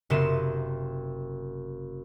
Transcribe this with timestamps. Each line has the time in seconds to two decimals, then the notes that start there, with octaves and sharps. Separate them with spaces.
0.10 F#1 C3 B3 C6 E7